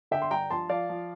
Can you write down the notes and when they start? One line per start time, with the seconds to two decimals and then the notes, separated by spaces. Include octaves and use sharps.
0.11 D3 E5 G5
0.22 C6
0.31 G2 G5 A#5
0.50 F3 A5 C6
0.69 F3 D5 F5
0.89 F3